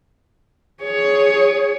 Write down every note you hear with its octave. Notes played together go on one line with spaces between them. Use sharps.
G#4 C#5